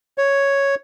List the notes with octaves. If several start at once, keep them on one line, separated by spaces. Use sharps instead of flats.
C#5